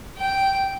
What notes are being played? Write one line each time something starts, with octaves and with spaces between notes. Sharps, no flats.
G5